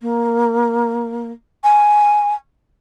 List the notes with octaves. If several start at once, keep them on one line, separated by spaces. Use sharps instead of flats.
A#3
G#5